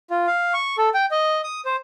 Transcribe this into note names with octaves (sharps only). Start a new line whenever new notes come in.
F4
F5
C#6
A4
G5
D#5
D#6
C5